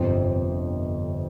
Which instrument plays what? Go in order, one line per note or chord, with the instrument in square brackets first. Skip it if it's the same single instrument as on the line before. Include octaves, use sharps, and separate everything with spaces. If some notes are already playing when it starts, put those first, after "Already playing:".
Already playing: [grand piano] G1 F2 C3 F3 C4